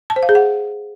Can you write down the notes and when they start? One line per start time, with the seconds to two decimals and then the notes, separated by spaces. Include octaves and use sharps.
0.10 A5
0.16 C5
0.23 F5
0.29 G#4
0.35 F#5